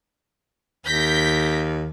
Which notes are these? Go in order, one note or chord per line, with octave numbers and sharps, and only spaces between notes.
D#2 G6 A#6 B6